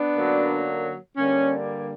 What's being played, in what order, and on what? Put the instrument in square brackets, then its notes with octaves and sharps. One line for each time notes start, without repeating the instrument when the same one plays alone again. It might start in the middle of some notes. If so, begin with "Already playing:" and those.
Already playing: [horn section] B3 D4
F#2 D3 F#3 A#3
G2 D3 G3 A#3 C#4